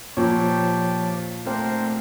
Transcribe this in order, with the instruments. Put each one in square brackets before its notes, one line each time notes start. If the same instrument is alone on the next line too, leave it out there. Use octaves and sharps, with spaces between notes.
[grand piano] A#2 [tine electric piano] F3 C5 C#5 [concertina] G4 G5 A5
[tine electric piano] A3 C4 [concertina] D4 A#4 C5